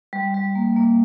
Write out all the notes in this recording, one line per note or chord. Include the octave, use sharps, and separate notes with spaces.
G3
G3
A#3
A#3